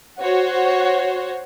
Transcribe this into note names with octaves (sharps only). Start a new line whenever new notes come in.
F#4 C5 C#5